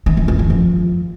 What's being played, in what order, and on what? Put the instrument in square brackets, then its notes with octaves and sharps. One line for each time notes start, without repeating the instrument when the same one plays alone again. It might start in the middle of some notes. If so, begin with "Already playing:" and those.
[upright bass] D#3
E3
E2
D#3
F3